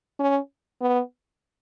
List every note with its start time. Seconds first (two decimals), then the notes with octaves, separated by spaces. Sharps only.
0.20 C#4
0.81 B3